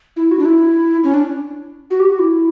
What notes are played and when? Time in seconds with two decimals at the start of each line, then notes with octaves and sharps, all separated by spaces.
0.16 E4
0.31 F#4
0.39 D4
0.45 E4
1.04 C#4
1.14 D4
1.91 F#4
2.00 G4
2.09 F#4
2.19 E4